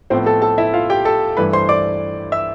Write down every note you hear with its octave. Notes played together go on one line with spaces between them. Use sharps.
A2 F3 B3 C4 C5
A4 A5
A4 A5
E4 E5
F4 F5
G4 G5
A4 A5
G2 E3 A3 B4 B5
C5 C6
D5 D6
E5 E6